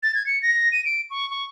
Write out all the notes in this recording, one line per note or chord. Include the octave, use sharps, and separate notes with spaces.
A6
G#6
C#7
A#6
D#7
D7
C#6
C#6